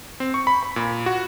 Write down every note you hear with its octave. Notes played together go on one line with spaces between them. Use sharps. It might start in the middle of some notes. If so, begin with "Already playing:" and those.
C4
C#6
B5
B5
A#2
F#4